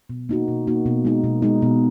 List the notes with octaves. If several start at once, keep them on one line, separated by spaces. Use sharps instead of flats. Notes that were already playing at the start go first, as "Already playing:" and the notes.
B2
A#3 D#4 F#4
B2
A#3 D#4 F#4
B2
G#3 D#4
B2
G#3 D#4
B2